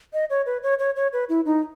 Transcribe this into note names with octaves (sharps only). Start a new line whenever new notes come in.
D#5
C#5
B4
C#5
C#5
C#5
B4
E4
D#4